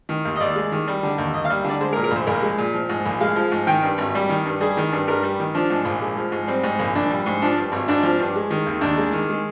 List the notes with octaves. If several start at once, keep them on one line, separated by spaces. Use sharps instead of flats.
D#3
D#2
D#5
D#2 D5
G#3
D#3
G3
D3
D#2
D#2 D#5
F5
G3
D3 D5
G#3 C5
A#4
A#2
A#4
A#1
C5
A#1 A#4
G#3
A#2
F3
G#2
A#1
G#3 F5
F3
G#2
D#3 G5
G2
G#1
G3
D#3
G2
G3 G#4
D#3
G2
G2 A#4
G3
D#3
F3 D4
G#2
A#1
G#3
F3
G#2
G3 C4
G#2
A#1
A#1 D4
G3
G#2
F3 D4
G2
G#1
G#1 D4
F3
G2
G#3
D#3
D#2
D#2 D4
G#3
D#3
G#3